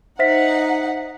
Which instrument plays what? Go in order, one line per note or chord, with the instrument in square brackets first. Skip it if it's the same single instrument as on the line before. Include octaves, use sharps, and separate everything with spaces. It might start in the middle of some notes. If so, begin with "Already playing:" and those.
[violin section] D#4 F#5 [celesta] C5 E5 B6